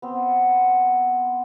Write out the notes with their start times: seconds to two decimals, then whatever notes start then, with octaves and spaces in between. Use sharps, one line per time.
0.02 B3 C4